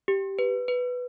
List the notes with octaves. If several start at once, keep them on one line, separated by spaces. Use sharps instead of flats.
G4
B4
B4